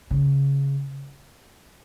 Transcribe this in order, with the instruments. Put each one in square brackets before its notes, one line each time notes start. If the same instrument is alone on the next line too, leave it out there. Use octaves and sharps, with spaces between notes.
[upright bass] C#3